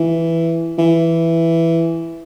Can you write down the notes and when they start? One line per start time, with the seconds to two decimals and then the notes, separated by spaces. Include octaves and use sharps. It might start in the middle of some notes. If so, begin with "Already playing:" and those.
Already playing: E3
0.78 E3